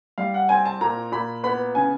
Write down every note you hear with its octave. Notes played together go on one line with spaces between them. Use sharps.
G3 F5
F#5
C4 G#5
A5
A#2 A#5
A#2 B5
B3 B5
C#3 G#5